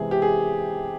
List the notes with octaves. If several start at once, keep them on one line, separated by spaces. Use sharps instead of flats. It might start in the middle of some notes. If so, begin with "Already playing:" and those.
Already playing: C3 E3 G#3 B3 G#4
G4
G#4